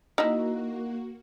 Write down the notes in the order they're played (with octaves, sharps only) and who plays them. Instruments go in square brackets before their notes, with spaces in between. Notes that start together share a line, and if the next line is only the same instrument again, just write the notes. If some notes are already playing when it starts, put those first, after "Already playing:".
[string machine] A#3 F#4 [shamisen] D#4 E4